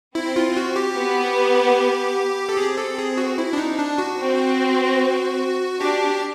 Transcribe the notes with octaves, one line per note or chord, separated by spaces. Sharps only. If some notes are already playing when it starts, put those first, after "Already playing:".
C4 E4
F4
F#4
G4
B3
A4
C4 G#4
A4
G#4
F#4
E4
D4
D#4
D4
F#4
C4
D4 G4